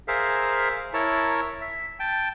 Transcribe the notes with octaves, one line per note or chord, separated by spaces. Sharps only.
G#4 A#4 C5 E5 F5
E4 A#4 C#5 A5
E5
G5 A5